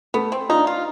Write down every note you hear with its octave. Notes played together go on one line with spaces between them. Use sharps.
A3 B3
C4
D4 D#4 F4
F4